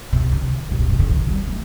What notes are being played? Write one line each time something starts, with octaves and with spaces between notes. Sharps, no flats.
C3
D3
C3
A#2
C3
D3
E3
G3
A3